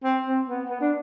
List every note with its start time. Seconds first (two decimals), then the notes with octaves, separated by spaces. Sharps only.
0.03 C4
0.26 C4
0.48 B3
0.69 B3
0.80 D4